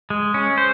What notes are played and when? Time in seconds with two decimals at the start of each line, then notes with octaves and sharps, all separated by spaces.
0.10 G#3
0.34 C#4
0.58 C5